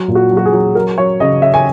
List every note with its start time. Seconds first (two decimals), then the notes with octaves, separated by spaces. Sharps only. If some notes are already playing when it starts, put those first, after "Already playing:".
Already playing: F#3
0.08 A#2
0.15 F#4
0.31 F#3
0.37 F#4
0.46 G#4
0.53 F#3
0.75 F#3 A#4
0.98 F#3 C#5
1.20 C#3 D#5
1.42 C#3 E5
1.54 G#5